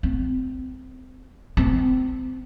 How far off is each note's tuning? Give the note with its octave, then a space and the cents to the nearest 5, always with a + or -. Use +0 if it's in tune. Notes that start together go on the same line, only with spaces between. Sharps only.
C4 -25
C4 -30